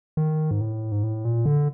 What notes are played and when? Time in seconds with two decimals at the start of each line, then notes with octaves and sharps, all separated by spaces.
0.17 D#3
0.51 G#2
0.61 A2
0.92 G#2
1.03 A2
1.25 A#2
1.46 D3